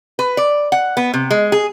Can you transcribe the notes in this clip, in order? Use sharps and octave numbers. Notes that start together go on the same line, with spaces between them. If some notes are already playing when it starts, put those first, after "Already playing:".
B4
D5
F#5
B3
C3
G#3
G#4